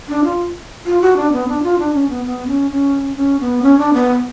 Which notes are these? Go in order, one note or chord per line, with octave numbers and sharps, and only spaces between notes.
D4
F4
F4
F#4
D4
B3
D4
F4
D4
C#4
B3
B3
C#4
C#4
C#4
B3
C#4
D4
B3